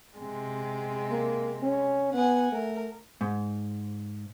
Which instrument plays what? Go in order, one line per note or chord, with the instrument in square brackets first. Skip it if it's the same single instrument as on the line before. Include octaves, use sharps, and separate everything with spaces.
[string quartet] C3 G#3
[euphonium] A#3
C#4
[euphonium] B3 [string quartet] F#5 G#5
[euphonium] A3 [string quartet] A#4
[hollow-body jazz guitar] G#2